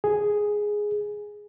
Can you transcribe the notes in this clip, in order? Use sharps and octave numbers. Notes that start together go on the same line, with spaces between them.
G#4